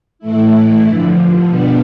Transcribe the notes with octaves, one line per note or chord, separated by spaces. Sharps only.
A2 E3 A3 E4
G2 D3 F3
B2 G3 B3 D4